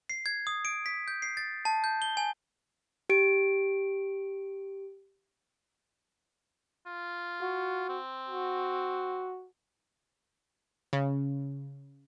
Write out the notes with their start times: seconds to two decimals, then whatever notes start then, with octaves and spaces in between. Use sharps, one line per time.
0.10 C7
0.26 G#6
0.47 D#6
0.65 D7
0.86 B6
1.08 G6
1.22 C7
1.37 A6
1.65 A5
1.84 G6
2.02 G7
2.17 G#5
3.09 G4 D7
6.86 F4
7.41 F#4
7.89 C4
8.29 F#4
10.93 C#3